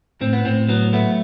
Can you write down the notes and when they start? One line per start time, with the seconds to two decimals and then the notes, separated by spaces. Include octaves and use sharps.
0.21 A2 C4
0.33 B3
0.45 A2 C4
0.69 F#3 B3
0.93 A3 B3